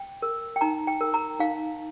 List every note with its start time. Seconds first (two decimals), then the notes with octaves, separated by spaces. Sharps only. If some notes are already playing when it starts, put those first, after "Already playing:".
Already playing: G5
0.22 A#4
0.56 G5
0.61 D#4 A#5
0.87 G5
1.01 A#4
1.14 A#5
1.39 D#4 F5